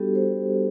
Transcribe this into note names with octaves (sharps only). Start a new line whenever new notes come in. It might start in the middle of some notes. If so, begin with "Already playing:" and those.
Already playing: G3 B3 D4 F#4 G4 A4
C5